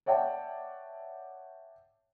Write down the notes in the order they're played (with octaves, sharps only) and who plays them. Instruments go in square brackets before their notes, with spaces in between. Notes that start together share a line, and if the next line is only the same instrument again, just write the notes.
[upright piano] C#5 D5 E5 F#5 G5 A5